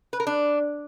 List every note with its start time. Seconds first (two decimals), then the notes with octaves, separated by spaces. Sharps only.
0.13 B4
0.20 A#4
0.27 D4